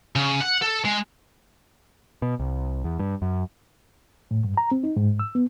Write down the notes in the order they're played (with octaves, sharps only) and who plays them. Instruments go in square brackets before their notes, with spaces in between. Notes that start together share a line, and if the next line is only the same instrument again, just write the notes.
[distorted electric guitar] C#3
F#5
A4
G#3
[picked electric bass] B2
C2
E2
G2
F#2
[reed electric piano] A2
G2
A#5
C4
D#4
G#2
E6
B3